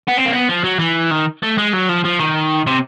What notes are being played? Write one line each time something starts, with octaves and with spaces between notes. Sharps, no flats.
B3
C4
A#3
B3
F3
F#3
E3
D#3
A3
G#3
F#3
F3
F3
D#3
C3